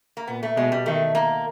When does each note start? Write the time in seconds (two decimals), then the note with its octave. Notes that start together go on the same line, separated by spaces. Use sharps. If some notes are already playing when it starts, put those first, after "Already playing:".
0.17 A#3
0.27 A#2 B3
0.43 A3
0.56 B2 G#3
0.72 G3
0.86 D#3 A3
1.15 A#3